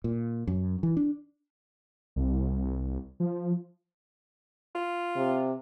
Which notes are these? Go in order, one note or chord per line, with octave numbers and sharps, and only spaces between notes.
A#2
F#2
E3
D4
C2
F3
F4
C3